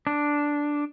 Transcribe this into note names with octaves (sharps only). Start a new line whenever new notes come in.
D4